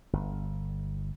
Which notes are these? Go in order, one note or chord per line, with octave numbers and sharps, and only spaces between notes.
G1